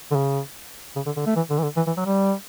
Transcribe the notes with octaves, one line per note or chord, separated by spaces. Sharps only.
D3
C#3
C#3
D3
D3
A3
E3
D3
E3
D3
E3
E3
F#3
G3